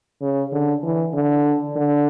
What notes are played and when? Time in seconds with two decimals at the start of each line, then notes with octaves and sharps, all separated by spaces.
0.22 C#3
0.52 D3
0.83 E3
1.13 D3
1.76 D3